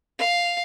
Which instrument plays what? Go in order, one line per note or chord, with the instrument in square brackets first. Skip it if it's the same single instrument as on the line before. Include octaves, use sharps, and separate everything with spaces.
[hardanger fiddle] F5